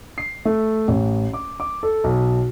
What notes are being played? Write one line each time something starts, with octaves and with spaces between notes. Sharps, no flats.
C7
A3
A1
D6
D6
A4
B1